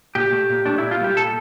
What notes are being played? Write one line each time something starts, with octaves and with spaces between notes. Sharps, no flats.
A#2 G4
A3
A#2
A3 D4
A#2 E4
F4
G3 A#3 G4
A#2 A4